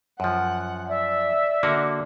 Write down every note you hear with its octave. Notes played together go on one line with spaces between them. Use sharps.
F#2 F3 F#5
D5 E5
D3 A#3 F#4